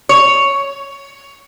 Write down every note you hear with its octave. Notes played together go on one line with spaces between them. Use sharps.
C#5